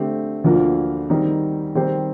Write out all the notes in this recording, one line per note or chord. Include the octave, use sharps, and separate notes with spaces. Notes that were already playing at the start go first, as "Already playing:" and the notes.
Already playing: D3 A3 C4 G4
D2 D3 F3 A#3 F4
D#3 G3 C4 D#4
D#3 G3 C4 G4 C5